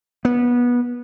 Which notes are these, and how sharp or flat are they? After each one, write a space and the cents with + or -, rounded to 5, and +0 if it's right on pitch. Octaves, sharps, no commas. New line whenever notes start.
B3 -20